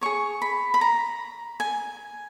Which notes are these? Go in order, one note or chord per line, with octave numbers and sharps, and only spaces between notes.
G#4 C#5 C#6
B5
B5
A#5
G#5